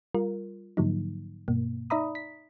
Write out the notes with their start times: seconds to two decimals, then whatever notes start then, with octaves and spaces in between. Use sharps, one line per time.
0.15 G3 F4 A#4
0.77 G#2 D3 F3 F#3 A#3 D#4
1.48 G2 B2 A#3
1.90 D#4 D5 E5 A#5 B5 D#6
2.15 B6